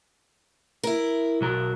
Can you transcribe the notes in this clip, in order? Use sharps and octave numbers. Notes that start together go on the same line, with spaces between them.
E4 A#4
B1 F#3 A#4